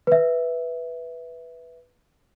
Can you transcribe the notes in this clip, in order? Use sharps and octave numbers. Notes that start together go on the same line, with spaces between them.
B4 E5